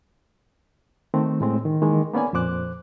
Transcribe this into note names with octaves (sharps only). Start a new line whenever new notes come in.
D#3 A3 C4
A2 G#3 C4
D#3
D#3 E3 G#3 A#3
A#3 B3 C#4 D5 G#5
F2 A#2 C5 D6 F#6